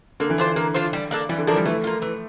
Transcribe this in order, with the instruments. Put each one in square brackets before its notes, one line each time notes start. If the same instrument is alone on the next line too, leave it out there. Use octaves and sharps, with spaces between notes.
[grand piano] D3 [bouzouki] A#3
[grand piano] E3
[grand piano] D3 [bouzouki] D4 F4 C5
[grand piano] D3 [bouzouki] A#3
[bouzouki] D4 F4 C5
G3
A#3 D4 A4
[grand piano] E3 [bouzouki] G3
[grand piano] D3
[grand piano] F3 [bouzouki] A#3 D4 A4
[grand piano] G3
[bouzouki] E3 [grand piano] A3
[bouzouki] A#3 F4
E3